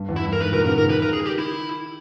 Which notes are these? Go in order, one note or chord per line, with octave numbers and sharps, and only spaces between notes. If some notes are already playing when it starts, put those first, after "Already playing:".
Already playing: G2
E2
E4
G2
A#4
G#2 B4
A#2 A#4
C#3 A#4
D#3 A#4
B4
A#4
G#4
G4
E4